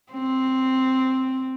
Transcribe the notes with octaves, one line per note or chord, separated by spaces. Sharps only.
C4